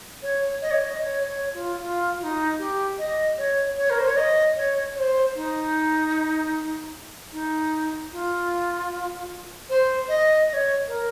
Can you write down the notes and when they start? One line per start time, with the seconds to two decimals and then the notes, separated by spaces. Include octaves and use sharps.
0.22 C#5
0.62 D#5
0.71 C#5
0.81 D#5
1.01 C#5
1.27 C#5
1.54 F4
1.80 F4
2.20 F4
2.23 D#4
2.59 G4
2.98 D#5
3.38 C#5
3.77 C#5
3.90 A#4
3.99 C5
4.08 C#5
4.17 D#5
4.56 C#5
4.95 C#5
4.99 C5
5.35 D#4
7.32 D#4
8.12 F4
9.69 C5
10.09 D#5
10.49 D#5
10.53 C#5
10.88 A#4